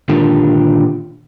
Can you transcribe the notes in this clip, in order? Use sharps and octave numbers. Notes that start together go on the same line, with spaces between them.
A#2 D3 D#3 D4 F4 G4